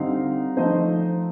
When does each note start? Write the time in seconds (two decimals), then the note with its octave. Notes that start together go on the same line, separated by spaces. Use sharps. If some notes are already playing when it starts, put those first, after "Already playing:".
Already playing: D3 G3 C4 D#4 F5
0.57 F3 A3 D#4 C5 D#5